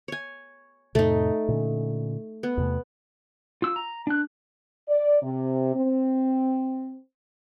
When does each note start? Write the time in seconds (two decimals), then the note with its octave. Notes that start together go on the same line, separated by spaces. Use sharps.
0.08 C#5 G#5
0.95 F2 A2 C3 A3 D#4
1.48 A#2 D3 C#4
2.43 B3
2.57 E2 C3 A3
3.62 F4 E6
3.76 A#5
4.07 D4 F#6
4.89 D5
5.22 C3
5.76 C4